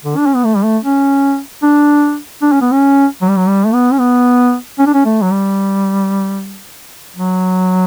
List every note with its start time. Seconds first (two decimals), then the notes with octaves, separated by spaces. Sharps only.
0.04 D3
0.17 D4
0.26 C#4
0.36 B3
0.44 A3
0.56 G3
0.64 A3
0.84 C#4
1.62 D4
2.42 D4
2.52 C#4
2.61 B3
2.72 C#4
3.21 F#3
3.29 G3
3.37 F#3
3.48 G3
3.65 A3
3.74 B3
3.92 C#4
4.00 B3
4.79 C#4
4.87 D4
4.94 C#4
5.05 A3
5.22 F#3
5.31 G3
7.16 F#3